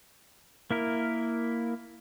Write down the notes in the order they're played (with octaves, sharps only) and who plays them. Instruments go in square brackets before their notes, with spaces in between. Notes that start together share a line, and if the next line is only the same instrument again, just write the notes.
[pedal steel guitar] A#3 E4 A#4